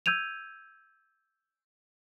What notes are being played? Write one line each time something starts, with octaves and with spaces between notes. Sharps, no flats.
E6 G6 G#6 D#7 F7